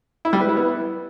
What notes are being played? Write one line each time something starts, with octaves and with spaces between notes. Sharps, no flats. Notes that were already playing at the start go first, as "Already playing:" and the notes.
E4
G3
B4
E4
B3